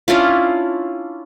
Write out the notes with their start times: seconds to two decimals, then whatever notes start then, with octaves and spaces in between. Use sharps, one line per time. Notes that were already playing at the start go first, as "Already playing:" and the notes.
0.08 C#4 D4 E4 F4